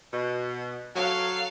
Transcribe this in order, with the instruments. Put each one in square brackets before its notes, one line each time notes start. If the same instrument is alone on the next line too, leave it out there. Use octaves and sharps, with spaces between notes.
[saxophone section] B2
[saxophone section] F#3 [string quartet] A4 F5